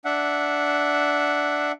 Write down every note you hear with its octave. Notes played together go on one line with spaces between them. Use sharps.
D4 E5 F#5